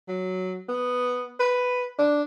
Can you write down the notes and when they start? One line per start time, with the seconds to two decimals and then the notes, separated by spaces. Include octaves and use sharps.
0.08 F#3
0.69 B3
1.39 B4
1.98 D4